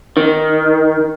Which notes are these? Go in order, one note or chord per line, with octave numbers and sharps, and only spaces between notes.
D#3